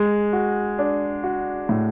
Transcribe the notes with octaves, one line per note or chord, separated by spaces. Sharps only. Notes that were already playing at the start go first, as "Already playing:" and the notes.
Already playing: G#3
F#4
D4
F#4
A2